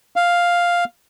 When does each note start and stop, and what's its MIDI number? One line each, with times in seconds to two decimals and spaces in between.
0.16 0.84 77